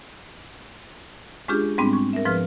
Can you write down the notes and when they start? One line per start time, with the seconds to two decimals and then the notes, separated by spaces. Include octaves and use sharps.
1.48 G#3 C#4 D4 F4 G4 G#4
1.78 G#2 G3 G#3 B3 C4 D4
1.93 C#6
2.13 A#4 E5
2.25 G#2 F3 B4 F6